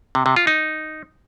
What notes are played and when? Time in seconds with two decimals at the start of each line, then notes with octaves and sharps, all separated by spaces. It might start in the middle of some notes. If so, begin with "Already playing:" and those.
0.15 C3
0.26 C3
0.36 F4
0.47 D#4